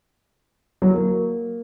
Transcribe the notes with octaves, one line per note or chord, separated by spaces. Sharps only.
F#3
A#3